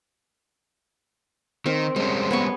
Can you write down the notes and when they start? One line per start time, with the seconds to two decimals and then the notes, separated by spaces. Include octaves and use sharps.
1.66 D#3 C4 A#4
1.96 G3 G#3 C4 C#4
2.31 B3 G#4 C#6